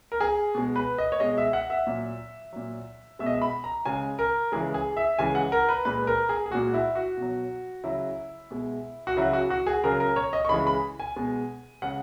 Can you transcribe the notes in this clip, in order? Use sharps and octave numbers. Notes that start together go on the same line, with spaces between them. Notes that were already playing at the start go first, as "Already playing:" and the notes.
A#4
G#4
B2 G#3
B4
D#5
C#5
B2 G#3 D#5
E5
F#5
E5
A#2 F#3
A#2 F#3
B2 G#3 E5
D#5
E5
B5
A#5
C#3 G#3 G#5
A#4
C#3 E3 G#3 G#4
G#4
E5
C#3 E3 G#3 G#5
F#5
A#4
B4
A#2 G#3 B4
A#4
G#4
G#4
A#2 G#3 F#4
E4
F#4
B2 F#3
C#3 F#3 E4
B2 G#3
F#4
C#3 F#3 E4
F#4
F#4
G#4
C#3 F#3 A#4
A#4
C#5
D#5
C#6
C#3 E3 G#3 B5
B5
G#5
B2 G#3
C#3 G#3 F#5